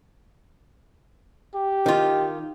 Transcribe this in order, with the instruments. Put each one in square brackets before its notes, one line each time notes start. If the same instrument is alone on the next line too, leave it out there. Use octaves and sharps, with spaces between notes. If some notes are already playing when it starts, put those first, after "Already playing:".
[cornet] G4
[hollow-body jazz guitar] D#3 F4